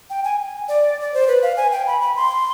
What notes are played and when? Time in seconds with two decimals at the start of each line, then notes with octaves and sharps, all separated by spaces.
0.10 G5
0.24 G#5
0.69 D5
1.01 D5
1.14 C5
1.28 B4
1.42 F5
1.57 G#5
1.72 G5
1.87 B5
2.01 B5
2.16 C6